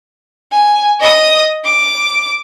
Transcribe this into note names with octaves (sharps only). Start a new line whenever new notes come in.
G#5
D#5 D#6
D6